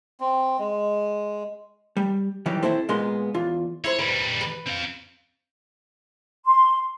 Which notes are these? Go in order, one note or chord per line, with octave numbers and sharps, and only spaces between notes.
C4
G#3
G3
D#3 E3 F#3 G3 G4
C4 E4 A4 C5
A#2 G#3 A#3 B3 C6
E2 F4
E4 C5 C#5
D#3 G3 B4
B4
C4 F5
C6